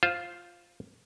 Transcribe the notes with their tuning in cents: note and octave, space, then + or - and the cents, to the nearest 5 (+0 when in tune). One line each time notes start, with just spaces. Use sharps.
F4 +0 C5 +0